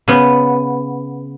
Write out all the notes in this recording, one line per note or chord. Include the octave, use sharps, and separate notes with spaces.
C#3 B3